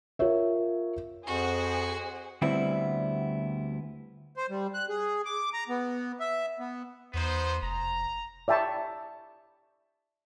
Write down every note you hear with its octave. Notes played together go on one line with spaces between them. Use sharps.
F4 A#4 C#5 E5
F2 F#4 G#4 C5 F#5
D2 G3 B3 C4 E4
C5
G3
F#6
G#4
D6
A#5
B3
E5
B3
E2 B3 D#4 C5
F1 A#5
D5 E5 G5 A5 B5 C#6